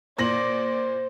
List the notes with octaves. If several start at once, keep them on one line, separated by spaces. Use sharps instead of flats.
A#2 C5 D5 A#6 F#7